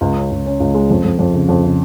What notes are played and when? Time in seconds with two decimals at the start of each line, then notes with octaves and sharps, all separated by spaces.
0.01 C#2
0.16 C#4
0.31 C#2
0.46 C#4
0.60 C#2
0.74 G#3
0.90 F2
1.05 F2
1.19 F2
1.34 C#3
1.49 F2
1.63 C#3